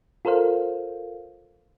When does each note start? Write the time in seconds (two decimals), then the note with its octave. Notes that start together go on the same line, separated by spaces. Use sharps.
0.25 F4 A4 A#4 C5 F5